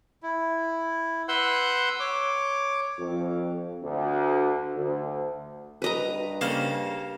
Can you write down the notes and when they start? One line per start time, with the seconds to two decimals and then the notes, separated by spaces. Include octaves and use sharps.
0.23 E4
1.28 B4 F#5 C6 E6 F#6 G6
2.00 C#5 D6
2.98 F2
3.83 D2
4.76 D2
5.82 G2 B4 D#5 A#5
6.41 C#3 A#3 A4 C5 F5